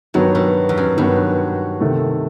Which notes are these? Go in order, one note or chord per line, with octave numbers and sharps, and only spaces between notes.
G2 D#3 F#3 B3 F#4
B2
E2
F#2
G2 D#3 F#3 B3 F#4
C3 D#3 A3